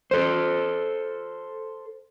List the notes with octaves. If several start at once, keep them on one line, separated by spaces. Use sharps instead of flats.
A4 C5